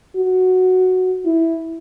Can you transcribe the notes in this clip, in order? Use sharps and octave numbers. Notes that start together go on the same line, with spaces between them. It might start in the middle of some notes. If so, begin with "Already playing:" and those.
F#4
E4